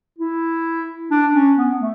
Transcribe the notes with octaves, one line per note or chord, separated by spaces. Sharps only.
E4
D4
C#4
B3
A3